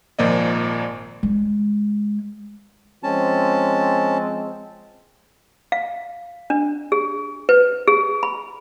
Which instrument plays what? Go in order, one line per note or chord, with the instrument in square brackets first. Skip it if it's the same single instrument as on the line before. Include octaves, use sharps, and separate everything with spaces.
[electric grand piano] G#1 A#2 F3 A#3 D5 D#5
[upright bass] G#3
[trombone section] F3 G#3 C4 [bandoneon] C#4 A5
[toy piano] F5
D4
G#4
B4
G#4
B5